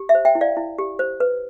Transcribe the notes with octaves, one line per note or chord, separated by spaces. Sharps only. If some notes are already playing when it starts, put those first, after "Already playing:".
Already playing: G4
E5
C5
E5 G5
E4
D5 F5
E4
G4
C5
B4